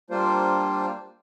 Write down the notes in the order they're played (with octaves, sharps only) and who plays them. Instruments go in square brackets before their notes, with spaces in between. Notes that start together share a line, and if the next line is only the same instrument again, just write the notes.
[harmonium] G3 A#3 D4 F4 C5